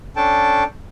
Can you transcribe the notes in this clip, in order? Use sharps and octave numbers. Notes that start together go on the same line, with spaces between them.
C#4 D4 A4 G5 A5